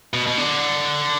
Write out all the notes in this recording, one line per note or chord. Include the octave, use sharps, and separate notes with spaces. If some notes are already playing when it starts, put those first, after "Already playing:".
B2
B2
D3